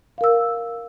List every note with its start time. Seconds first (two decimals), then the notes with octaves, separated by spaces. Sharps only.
0.18 F5
0.21 A#4
0.24 E6